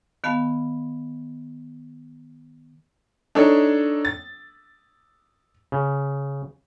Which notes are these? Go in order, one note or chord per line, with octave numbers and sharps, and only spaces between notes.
D#3 B3 F5 A5
D4 D#4 A4 C#5
A6
C#3